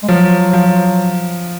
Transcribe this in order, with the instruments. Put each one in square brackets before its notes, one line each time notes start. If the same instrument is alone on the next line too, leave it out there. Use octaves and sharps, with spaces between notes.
[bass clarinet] G#3
[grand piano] F3 [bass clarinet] F#3
[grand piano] F3